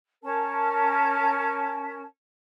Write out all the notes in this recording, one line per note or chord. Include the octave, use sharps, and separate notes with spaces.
C#4 A#4 A5